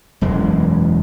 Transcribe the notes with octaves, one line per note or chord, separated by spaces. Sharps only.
E1 F#2 E3 G#3